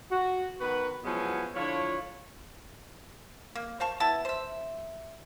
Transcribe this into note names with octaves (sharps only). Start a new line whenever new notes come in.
F#4
D#3 B3 F#4 B4
F3 F#3 G#3 B3 C#4 E4
D3 F3 E4 F4 C#5
A#3
C5 F5 A5 C#6
B3 E4 E5 A5
C5 E5